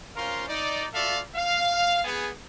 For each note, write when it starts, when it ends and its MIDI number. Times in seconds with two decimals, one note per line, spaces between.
0.17 0.45 61
0.17 0.45 65
0.17 0.45 70
0.17 0.45 72
0.17 0.45 77
0.17 0.45 84
0.48 0.86 63
0.48 0.86 74
0.94 1.20 65
0.94 1.20 66
0.94 1.20 69
0.94 1.20 74
0.94 1.20 76
0.94 1.20 77
1.35 2.00 77
2.05 2.30 59
2.05 2.30 68